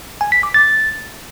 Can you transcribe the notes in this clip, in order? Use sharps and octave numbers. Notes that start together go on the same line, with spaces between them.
G#5
B6
D6
A6